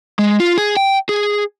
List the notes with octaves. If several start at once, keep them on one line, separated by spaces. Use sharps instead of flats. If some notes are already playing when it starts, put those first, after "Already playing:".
G#3
F4
G#4
G5
G#4